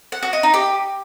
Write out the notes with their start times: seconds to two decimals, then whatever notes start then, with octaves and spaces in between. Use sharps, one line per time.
0.12 F#5
0.23 F#4
0.33 D#5
0.43 D#4
0.54 G4